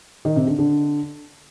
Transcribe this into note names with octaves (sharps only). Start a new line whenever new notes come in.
D#3
C3
D3
D3